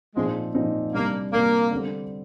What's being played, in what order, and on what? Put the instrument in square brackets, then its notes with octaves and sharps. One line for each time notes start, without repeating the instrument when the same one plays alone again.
[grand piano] A#2 F3 C4 D#4 [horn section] G#3
[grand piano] A#2 F3 C4 D#4
[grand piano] C3 G3 D4 [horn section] A#3
[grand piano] C3 G3 D4 [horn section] A#3
[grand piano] D3 G3 C4